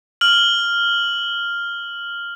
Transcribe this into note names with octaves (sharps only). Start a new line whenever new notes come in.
F6 F#7